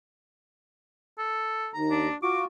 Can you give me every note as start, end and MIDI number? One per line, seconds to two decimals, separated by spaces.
1.18 1.70 69
1.74 2.08 39
1.74 2.08 82
1.91 2.15 62
2.23 2.45 65
2.23 2.45 66
2.23 2.41 86